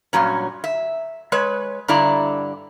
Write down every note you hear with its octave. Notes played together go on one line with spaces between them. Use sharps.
G2 A#2 F#3 C#4
E5
G#3 B4 C#5
G2 D3 E4 D5 A#5